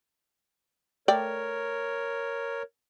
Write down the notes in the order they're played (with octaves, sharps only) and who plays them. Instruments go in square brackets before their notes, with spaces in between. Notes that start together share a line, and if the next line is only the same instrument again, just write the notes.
[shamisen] A3 D5 G5 [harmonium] A#4 C#5